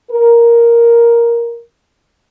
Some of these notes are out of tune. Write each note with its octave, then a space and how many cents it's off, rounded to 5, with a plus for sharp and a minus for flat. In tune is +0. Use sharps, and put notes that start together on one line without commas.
A#4 +5